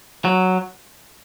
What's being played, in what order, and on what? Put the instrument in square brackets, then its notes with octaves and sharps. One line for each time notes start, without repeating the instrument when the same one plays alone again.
[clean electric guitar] F#3